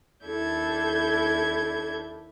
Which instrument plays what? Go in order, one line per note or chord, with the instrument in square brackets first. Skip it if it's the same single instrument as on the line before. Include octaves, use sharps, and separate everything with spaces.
[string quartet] D#2 D4 E4 A4 G6 G#6